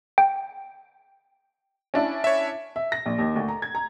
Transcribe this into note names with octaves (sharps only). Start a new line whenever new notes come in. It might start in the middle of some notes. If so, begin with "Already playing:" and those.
G5
C#4 D4 E4
C#5 E5
E5
A#6
A#1
D#2
D2
A#5
G#6
A#5